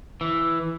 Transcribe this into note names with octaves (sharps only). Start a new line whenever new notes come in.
E3